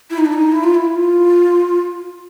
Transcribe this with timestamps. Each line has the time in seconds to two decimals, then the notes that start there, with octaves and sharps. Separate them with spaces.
0.10 E4
0.18 D#4
0.25 D4
0.33 D#4
0.52 E4
0.63 F4
0.74 E4
0.94 F4